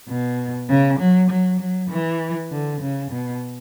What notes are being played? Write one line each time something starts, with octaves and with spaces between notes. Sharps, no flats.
B2
C#3
F#3
F#3
F#3
E3
D3
C#3
B2